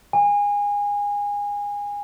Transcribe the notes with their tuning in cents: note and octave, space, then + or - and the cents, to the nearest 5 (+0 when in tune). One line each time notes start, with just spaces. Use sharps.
G#5 -25